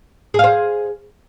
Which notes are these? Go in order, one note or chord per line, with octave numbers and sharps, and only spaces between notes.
G#4 C5 F5